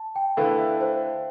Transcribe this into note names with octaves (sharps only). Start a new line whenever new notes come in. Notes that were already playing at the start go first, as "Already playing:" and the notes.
Already playing: A5
G5
D3 A3 E4 B4 F5
E5
C5